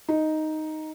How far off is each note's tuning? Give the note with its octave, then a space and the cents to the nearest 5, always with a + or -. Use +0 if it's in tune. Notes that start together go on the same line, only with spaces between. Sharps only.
D#4 +0